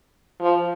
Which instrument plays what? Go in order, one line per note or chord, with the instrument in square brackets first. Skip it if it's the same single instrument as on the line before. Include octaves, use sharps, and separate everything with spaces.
[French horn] F3